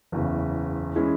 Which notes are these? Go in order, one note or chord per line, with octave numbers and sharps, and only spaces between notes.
F#1 E2 C#3
E3 G#3 C#4